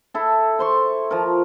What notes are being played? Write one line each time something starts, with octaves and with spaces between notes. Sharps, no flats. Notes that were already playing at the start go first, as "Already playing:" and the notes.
E4 A4
C5 C6 C#6
F3 A#4